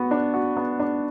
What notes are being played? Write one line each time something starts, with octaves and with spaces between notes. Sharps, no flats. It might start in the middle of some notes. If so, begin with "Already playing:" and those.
Already playing: B3 F#4
D4
F#4
B3
D4